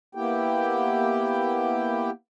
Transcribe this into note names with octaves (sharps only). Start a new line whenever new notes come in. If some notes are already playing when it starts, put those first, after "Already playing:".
A#3 B3 E4 G4 G5